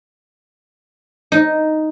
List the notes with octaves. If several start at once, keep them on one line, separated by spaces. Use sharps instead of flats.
D#4